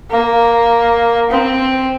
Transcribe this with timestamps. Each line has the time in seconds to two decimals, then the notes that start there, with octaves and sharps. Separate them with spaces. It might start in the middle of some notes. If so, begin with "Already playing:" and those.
0.11 A#3
1.31 C4